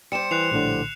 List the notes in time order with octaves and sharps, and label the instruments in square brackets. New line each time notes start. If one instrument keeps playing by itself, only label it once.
[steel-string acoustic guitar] G3 C5 [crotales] C#7 E7
[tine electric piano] E3 [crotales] F#6 C7 F7
[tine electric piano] A#1 A2 D3